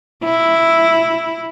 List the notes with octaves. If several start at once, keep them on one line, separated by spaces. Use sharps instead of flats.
E4